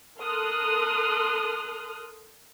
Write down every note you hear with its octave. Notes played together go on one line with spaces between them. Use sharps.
A4 A#4 C6 D#6 F6 F#6